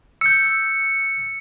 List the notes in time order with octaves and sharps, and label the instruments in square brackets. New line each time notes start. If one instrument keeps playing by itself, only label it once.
[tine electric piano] E6 G6 [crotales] C#7